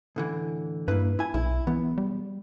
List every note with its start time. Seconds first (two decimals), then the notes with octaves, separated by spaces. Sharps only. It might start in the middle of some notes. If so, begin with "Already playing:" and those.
0.16 A2 D3 E3
0.88 G2 A#3 E4 B4
1.19 E4 G#5
1.34 B1 E4
1.67 B1 E2 E3 B3
1.98 G3